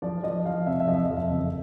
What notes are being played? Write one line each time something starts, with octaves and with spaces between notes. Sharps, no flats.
F3 D5
F3 D#5
F3 F5
C3 E5
E5
F3 D#5
F2 D#5
E5
F#1